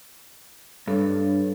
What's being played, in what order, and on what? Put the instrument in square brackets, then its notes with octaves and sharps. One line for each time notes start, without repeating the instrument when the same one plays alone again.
[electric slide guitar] G2 [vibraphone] D4 A4 C#5